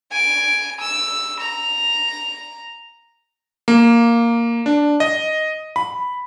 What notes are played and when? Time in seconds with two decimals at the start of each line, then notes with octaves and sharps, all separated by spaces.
0.12 G#5 D7
0.81 E6
1.40 A#5
3.68 A#3
4.66 D4
5.00 D#5
5.76 B5